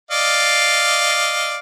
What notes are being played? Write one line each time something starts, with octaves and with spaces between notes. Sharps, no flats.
D5 D#5 F5